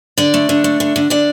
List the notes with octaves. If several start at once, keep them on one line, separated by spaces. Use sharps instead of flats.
D3 D5
A3
D3
A3
D3
D3
D3 D5